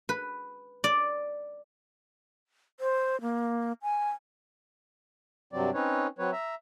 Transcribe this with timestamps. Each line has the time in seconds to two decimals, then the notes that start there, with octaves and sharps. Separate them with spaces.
0.09 B4
0.84 D5
2.80 C5
3.21 A#3
3.82 G#5
5.53 G2 C3 F#3 C4 D5
5.74 C4 C#4 D#4 B4 C#5
6.19 F#3 C4 B4 C#5
6.32 E5 A#5